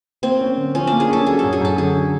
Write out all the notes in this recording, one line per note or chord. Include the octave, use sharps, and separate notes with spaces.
A#3 C4
C#4
D3
F3 C#4
A#3 D4
G#4
C#4 A4
F#3 G#4
F#2 A4
G#4
F#2 A4
D3 G#4
F#3